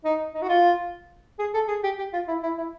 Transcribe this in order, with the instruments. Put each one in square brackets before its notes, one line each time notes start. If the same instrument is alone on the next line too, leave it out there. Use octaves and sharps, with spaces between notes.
[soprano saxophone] D#4
D#4
F#4
F4
G#4
A4
G#4
G4
G4
F4
E4
E4
E4